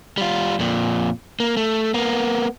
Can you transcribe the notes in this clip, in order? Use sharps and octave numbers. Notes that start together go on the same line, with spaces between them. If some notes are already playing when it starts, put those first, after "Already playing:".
G3 F4
F2 A#2
A#3
A3
A#3 B3